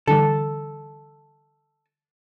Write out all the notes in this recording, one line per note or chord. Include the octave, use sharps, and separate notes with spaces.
D3 E3 G3 A4